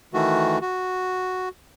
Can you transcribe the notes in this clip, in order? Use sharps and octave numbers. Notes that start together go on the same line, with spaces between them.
D#3 E3 A3 F#4
F#4